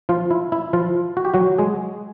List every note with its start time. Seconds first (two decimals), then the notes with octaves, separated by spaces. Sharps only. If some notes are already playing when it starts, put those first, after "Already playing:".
0.09 F3 F4
0.31 E4
0.52 E4
0.73 F3 F4
1.17 F#4
1.25 G4
1.34 F#3 F#4
1.58 G#3 G#4